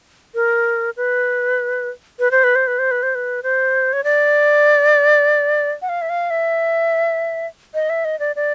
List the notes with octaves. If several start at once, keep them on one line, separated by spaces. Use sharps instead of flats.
A#4
B4
B4
C5
B4
C5
B4
C5
B4
C5
B4
C5
C#5
D5
F#5
F5
E5
F5
E5
D#5
E5
D#5
D5
D5